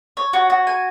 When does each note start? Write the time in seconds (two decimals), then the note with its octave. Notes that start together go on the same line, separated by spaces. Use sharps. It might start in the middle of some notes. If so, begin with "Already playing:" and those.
0.17 C#5
0.33 F#4
0.50 F#4
0.67 G#5